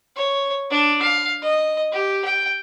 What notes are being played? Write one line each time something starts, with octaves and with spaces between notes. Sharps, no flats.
C#5
D4
F5
D#5
G4
G5